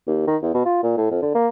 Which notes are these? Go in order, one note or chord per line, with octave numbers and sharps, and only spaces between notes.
D#2
D#3
E2
B2
F4
A#2
A2
F2
D3
A#3